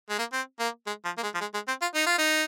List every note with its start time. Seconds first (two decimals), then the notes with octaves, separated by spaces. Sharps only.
0.09 G#3
0.19 A#3
0.33 C4
0.60 A#3
0.87 G#3
1.05 F3
1.18 A#3
1.23 G#3
1.35 F3
1.41 G#3
1.54 G#3
1.68 C4
1.82 F4
1.95 D#4
2.06 F4
2.18 D#4